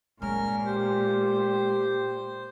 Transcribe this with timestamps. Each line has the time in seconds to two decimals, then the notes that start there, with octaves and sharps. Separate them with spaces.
0.22 A#2 G#3 C#4 A#4 F6
0.66 G4 C5